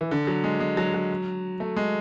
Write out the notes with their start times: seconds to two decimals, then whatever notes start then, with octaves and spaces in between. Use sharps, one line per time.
0.01 E3
0.11 D3
0.27 F#3
0.44 G#3
0.60 G#3
0.77 F#3
0.94 F#3
1.60 A3
1.76 G#3